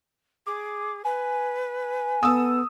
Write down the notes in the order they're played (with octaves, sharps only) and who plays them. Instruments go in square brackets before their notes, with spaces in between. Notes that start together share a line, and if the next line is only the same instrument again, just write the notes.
[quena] G#4 [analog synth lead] D6
[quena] B4 [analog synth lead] G#5
[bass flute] B3 [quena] A4 [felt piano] D#6 E6